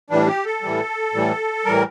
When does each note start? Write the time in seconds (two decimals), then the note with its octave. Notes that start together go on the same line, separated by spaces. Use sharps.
0.10 A2 E3 G3 D4
0.27 G4
0.45 A4
0.62 A2 E3 G3
1.14 A2 E3 G3
1.65 A2 E3 G3 A#4